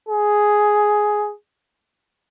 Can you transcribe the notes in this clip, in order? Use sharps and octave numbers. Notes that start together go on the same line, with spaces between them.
G#4